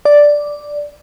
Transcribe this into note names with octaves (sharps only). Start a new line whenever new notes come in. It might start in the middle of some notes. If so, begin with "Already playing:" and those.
D5